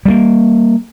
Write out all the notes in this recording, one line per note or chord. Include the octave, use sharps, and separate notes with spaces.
G3 G#3 A#3